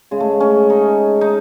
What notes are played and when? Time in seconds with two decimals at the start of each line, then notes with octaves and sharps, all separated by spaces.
0.11 C#3 G#3
0.20 A3
0.40 C#4
0.70 D#4
1.21 D#4